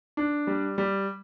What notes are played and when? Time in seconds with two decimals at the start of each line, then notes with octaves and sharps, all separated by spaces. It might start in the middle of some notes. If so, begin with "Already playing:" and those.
0.17 D4
0.47 G3
0.78 G3